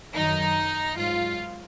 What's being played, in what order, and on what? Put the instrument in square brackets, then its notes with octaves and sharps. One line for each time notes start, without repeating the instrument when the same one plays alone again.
[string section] F#2 D#3 F#3 D#4
G#2 F#3 F4